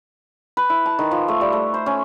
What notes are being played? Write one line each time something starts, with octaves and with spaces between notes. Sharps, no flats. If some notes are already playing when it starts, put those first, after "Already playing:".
B4
E4
A5
D#3
F3
A3
G3
A3
C5
C#4